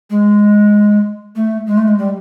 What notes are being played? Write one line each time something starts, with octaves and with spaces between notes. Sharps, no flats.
G#3
A3
G#3
A3
G#3
G3